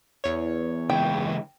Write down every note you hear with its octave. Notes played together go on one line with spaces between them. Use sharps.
E2 C#5
C#2 E3 G5